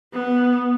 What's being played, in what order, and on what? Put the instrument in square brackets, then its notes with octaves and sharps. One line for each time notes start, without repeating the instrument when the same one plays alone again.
[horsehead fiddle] B3